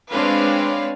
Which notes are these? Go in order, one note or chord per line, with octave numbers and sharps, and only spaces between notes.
G#3 C4 D4 B4 C#5 F5